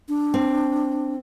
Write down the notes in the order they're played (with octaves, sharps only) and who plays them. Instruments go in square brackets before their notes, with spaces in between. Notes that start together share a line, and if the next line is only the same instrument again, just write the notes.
[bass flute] D4
[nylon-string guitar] C4